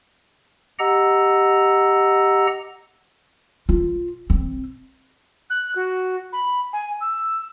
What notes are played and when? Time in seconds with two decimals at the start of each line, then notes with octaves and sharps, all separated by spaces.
0.79 G4 D#5 F#5 A#5 E6
3.69 F4
4.30 C4
5.50 F#6
5.76 F#4
6.33 B5
6.73 G#5
7.01 E6